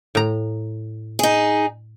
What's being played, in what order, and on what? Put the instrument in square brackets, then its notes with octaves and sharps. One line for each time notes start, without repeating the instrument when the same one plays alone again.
[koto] A2 A#5
[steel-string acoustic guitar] D#4 G#4